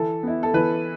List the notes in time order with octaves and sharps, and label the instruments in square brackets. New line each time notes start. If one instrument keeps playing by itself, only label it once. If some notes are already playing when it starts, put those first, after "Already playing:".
Already playing: [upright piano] E3 A4
B3 E4
A4
E3 B4